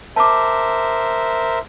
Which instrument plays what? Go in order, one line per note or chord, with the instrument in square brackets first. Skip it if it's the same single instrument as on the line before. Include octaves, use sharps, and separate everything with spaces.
[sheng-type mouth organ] A#4 C5 E5 [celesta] A5 D6